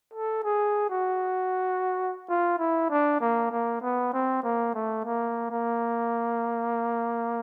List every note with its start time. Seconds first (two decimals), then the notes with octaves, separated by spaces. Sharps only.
0.14 A4
0.44 G#4
0.90 F#4
2.29 F4
2.59 E4
2.90 D4
3.21 A#3
3.51 A#3
3.82 B3
4.13 C4
4.43 A#3
4.74 A3
5.05 A#3
5.51 A#3